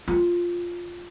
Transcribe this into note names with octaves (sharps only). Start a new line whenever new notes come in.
F4